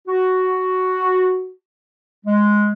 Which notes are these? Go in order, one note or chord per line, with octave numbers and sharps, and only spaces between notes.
F#4
G#3